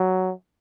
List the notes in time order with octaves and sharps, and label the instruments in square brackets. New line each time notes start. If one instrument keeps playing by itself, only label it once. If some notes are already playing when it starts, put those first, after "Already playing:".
Already playing: [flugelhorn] F#3